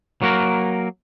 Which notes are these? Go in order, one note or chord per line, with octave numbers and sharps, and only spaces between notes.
F#3 A#3 F#4 A#4